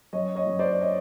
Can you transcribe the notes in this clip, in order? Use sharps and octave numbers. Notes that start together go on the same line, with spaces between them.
F#2 C#5 D#5
C#5 D#5
F#2
C5 D5
C#5 D#5